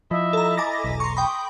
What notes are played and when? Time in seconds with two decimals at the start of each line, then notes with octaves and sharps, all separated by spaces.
0.11 F3 E4 D#5 E5
0.33 A4 A#5
0.58 G#5 D6 A6 A#6
0.84 E1 B1 B6
1.00 A#5 C6 C#6
1.17 G5 B5 D#6